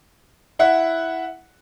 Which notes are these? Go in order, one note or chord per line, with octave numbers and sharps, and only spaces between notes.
E4 E5 F#5